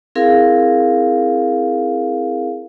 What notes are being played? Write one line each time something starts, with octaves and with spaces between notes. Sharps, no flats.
C4 E4 G#4 A#4 F5